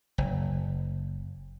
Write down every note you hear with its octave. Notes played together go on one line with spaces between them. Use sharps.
F#1